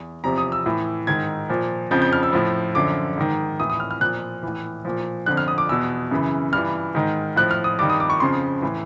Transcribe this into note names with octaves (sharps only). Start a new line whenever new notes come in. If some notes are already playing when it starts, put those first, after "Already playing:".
Already playing: E2
E2 C3 F3 A#5
D#6
E6
A2 E3
G#2 D#3 G#6
A#2 F3
F2 C#3 F3 G6
G6
F6
E6
A2 F3
F#2 D3 F3 D6
G#2 D#3
A2 E3 D#6
D#6
F6
F6
A#2 F3 F#6
A2 E3
A#2 F3
F2 D3 F3 F#6
F6
D#6
D6
E2 B2 E6
F#2 C#3 E3
G2 E3 F6
G#2 D#3
A2 F3 F#6
F6
D#6
G2 D#3 D6
D#6
D6
C#6
F2 C#3 F3 C6
A2 E3